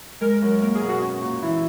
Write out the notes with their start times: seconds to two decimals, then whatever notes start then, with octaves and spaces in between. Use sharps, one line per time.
0.21 G#3 A#4
0.41 F#2 A#4
0.62 A#3 A#4
0.75 G#4
0.81 B2
0.88 F#4
1.02 C#4
1.21 A#2
1.42 E3 E4